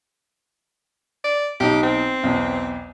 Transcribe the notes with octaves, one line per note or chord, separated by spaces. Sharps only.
D5
B1 D#4 G4
C4
B1 E2